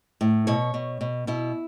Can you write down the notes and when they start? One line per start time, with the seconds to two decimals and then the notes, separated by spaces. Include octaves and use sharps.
0.21 A2
0.47 B2 C#5
0.74 B2
1.01 B2
1.27 B2 E4